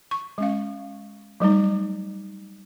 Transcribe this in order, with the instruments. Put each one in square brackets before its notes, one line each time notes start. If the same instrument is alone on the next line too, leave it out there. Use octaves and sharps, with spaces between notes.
[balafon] C#6
G#3 C#4 F5
F#3 G3 A3 D#4